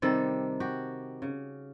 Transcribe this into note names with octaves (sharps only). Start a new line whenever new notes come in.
C3 D#3 G3 A4
F#4 G4
C#3